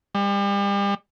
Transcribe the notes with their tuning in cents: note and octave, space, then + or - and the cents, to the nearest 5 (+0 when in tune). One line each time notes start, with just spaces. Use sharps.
G3 +35